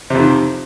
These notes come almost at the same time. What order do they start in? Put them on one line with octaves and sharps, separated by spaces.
C3 F2 D#3